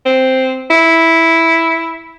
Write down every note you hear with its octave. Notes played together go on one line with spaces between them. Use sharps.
C4
E4